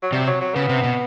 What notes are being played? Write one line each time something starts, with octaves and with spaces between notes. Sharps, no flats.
F#3
C3 G3
F#3
F#3
C#3 B3
C3
B2